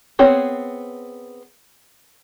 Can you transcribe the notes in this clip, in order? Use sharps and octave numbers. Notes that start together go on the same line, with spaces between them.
B3 C4 G#4 C#5